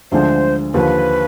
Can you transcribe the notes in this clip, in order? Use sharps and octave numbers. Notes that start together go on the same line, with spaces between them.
D2 D3 F3 G#3 D4 C5
D#2 D3 F3 B4